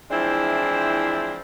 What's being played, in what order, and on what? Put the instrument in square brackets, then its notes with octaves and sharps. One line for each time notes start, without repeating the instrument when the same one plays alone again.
[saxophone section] E3 F3 G#3 C4 D4 E4